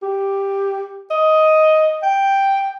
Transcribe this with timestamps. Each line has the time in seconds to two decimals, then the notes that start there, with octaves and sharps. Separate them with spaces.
0.03 G4
1.11 D#5
2.03 G5